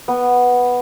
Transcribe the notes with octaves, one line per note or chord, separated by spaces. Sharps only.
B3